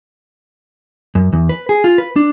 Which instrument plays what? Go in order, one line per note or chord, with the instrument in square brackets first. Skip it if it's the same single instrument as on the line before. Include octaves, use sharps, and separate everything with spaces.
[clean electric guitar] F#2
E2
B4
G#4
F4
B4
D4